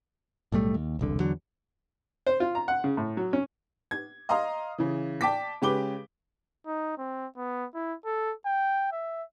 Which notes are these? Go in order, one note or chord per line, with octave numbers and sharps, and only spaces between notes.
B1 A2 G3 A3
D#2
E1 C2 D3
E2 D3 F#3
C5
F4
A#5
F#5
C#3
A2
F#3
C#4
G#6
D#5 F5 A#5 C6 D#6
C#3 E3
D5 G5 A5 D6 B6
C#3 G#3 G4 B4 D6 G7
D#4
C4
B3
E4
A4
G5
E5